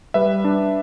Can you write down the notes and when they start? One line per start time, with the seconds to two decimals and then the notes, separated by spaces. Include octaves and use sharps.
0.14 G3 B4 E5
0.45 D4